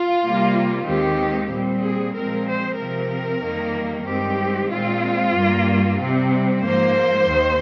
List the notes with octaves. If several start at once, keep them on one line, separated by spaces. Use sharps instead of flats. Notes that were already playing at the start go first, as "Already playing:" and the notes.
Already playing: F4
C3 G3 A#3
D#2 D#3 G#3 C4 G4
A#2 G3 C4
G#4
A#2 F3 G#3 C4 A#4
C5
C3 F3 C4 A#4
F2 D#3 G3 A#3
G2 D#3 G#3 C4 G4
A#2 G#3 C4 F4
G2 G3 A#3
C3 G3 C4
G#2 F3 A#3 C5
D#2 D#3